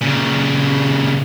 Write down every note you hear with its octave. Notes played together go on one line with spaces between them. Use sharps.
A#2 C#3